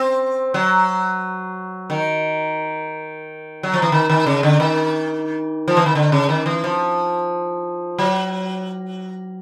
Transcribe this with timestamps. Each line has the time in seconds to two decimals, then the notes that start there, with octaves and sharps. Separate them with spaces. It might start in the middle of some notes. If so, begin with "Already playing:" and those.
Already playing: C4
0.54 F#3
1.90 D#3
3.63 F#3
3.74 F3
3.82 E3
3.92 D#3
4.10 D#3
4.26 C#3
4.43 D3
4.60 D#3
5.68 F3
5.77 E3
5.86 D#3
5.95 D3
6.12 C#3
6.29 D#3
6.46 E3
6.64 F3
7.99 F#3